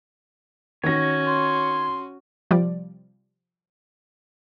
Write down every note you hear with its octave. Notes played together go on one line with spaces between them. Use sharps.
D#3 C#4 F#4 C#5 A#6
C6
C3 F3 G3 D5